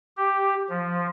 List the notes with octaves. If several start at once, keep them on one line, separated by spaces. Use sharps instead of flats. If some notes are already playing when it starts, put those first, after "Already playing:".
G4
F3